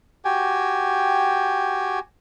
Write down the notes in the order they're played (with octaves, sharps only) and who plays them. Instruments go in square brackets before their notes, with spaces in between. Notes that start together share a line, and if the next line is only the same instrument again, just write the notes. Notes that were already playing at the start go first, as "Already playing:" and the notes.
[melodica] F#4 G4 G5 G#5